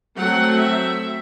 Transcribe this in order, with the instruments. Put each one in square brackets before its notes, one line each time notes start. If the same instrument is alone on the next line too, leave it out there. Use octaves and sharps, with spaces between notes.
[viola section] F#3 A3 C4 F#5
E5